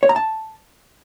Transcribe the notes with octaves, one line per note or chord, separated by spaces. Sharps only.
C#5
A#5
A5